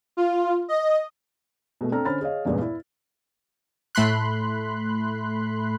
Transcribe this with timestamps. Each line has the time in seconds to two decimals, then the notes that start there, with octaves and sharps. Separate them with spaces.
0.17 F4
0.68 D#5
1.81 B2 G#3 A3
1.92 C4 D4 A4 A#5 F6
2.05 D3 C#4 C5 B5 F6 A6
2.21 G#4 C#5 D#5 F5
2.45 E2 G2 A#2 C#3 G#3 B3
2.62 E4
3.95 A2 A3 B5 C6 F#6